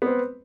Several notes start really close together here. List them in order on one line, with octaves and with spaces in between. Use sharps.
B3 C4 B4